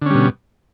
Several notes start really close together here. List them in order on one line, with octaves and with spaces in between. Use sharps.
D3 C#4 G3 B2